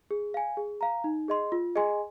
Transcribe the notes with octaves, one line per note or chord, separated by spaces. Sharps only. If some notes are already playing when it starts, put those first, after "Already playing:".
G#4
F5 G#5
G#4
F5 A#5
D#4
G#4 D#5 C6
F4
G#4 D#5 G#5 C6